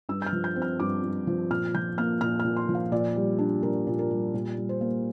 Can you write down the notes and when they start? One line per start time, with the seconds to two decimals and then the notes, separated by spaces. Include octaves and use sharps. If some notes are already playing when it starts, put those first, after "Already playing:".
0.09 G2 E6
0.22 G6
0.26 F6
0.33 F3
0.44 G6
0.56 C4
0.62 F6
0.80 G2 D6
1.03 G2
1.27 F3
1.51 A#2 F6
1.75 F3 G6
1.98 A#3 F6
2.21 A#2 F6
2.40 A#2 F6
2.57 C6
2.69 F3
2.75 F5
2.92 A#2 D5
3.16 G3
3.39 D4
3.63 A#2 A#4
3.87 A#2
3.99 A#4
4.11 G3
4.34 A#2
4.57 G3
4.69 C5
4.81 A#3